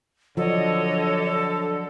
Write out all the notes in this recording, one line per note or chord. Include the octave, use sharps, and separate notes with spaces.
D3 F3 F#3 A4 C#5 D#5